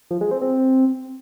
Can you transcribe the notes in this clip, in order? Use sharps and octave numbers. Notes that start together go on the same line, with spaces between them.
F3
G#3
C4
C4